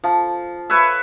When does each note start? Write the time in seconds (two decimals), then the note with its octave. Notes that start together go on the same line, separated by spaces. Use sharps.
0.04 F3
0.70 B4 C#5 E5